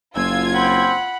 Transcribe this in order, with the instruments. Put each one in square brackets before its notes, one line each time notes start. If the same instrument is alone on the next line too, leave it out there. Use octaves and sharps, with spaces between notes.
[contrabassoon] F#1 [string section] F4 G#6 [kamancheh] E6
[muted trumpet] C4 [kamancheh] F#5 B5